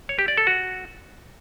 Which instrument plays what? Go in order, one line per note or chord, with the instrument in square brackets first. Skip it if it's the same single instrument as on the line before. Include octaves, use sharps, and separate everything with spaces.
[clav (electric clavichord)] C#5
G4
D5
A4
F#4